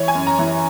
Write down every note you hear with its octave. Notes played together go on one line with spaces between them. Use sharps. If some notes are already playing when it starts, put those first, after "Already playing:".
Already playing: E3 C#5
G#5
F#2
A#5
E3